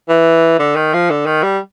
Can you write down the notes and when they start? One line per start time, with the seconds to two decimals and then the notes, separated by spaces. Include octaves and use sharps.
0.09 E3
0.59 D3
0.76 D#3
0.93 F3
1.10 D3
1.26 D#3
1.43 G3